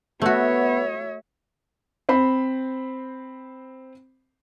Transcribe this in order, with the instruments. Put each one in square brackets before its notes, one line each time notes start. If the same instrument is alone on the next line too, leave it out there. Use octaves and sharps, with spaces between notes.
[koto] A3 F#4 [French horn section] B3 [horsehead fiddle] C#5 E5
[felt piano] C4 C5 B5